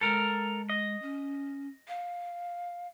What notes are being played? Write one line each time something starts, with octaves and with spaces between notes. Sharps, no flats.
G#3 A4 A#4
D#5
C#4
F5